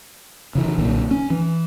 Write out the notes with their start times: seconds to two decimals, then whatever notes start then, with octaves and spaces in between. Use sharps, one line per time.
0.55 C#3 E3
0.78 B1 A#2 D3
1.11 C#4
1.30 E3